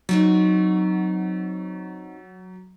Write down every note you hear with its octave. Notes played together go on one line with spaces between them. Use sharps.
F#3 C4 D#4 F#4